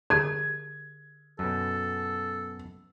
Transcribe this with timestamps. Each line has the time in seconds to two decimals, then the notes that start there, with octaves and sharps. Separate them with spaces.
0.10 D3 G4 G#4 G#6
1.39 F#2 B2 A4